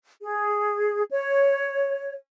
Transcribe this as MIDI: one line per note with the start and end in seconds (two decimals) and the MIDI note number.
0.21 1.02 68
1.11 2.13 73